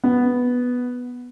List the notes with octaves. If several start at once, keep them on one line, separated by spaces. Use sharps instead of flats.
B3